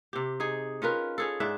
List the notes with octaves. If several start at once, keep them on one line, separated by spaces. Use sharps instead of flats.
C3 G4
D#4 G#4
C#4 F4 A#4 B4
C#4 G#4 A4
G#2 D4 E5